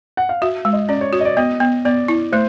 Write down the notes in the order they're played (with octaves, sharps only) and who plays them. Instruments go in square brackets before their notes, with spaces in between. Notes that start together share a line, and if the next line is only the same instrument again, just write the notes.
[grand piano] F#5
F5
[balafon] F#4 [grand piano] E5
[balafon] G#3
[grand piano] D#5
[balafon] C#4 [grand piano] D5
[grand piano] C#5
[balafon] F#4 [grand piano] C#5
[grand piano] D#5
D5
[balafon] B3 [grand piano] D#5
[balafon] B3
[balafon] B3 [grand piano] D5
[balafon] E4
[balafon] A3 [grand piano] C5